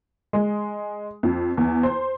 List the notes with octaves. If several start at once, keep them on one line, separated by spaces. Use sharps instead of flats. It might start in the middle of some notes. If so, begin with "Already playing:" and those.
G#3
F2
E2
C5